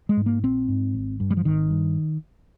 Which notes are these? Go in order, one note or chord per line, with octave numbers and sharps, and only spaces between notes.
G#3
G#2
A#3
A#1 C4
G#2
G#1
G2
G3
F3
G#1 D#3
G2